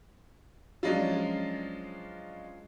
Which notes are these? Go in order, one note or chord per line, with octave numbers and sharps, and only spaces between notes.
F3 F#3 G#3 C#4 D4 F4